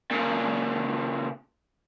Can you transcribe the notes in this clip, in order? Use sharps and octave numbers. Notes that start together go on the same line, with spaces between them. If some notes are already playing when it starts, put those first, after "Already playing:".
A#2 C#3